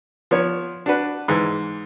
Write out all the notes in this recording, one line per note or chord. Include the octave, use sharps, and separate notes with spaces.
F3 B3 C#5
D4 F#4 B4
G#2 E3